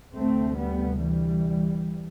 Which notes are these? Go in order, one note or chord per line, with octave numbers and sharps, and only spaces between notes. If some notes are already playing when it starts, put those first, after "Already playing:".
D2 C3 A3 C4
G3 B3
E3 G3